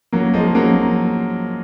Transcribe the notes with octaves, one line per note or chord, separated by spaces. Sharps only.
F#3 A#3
F3 G#3
F#3 A#3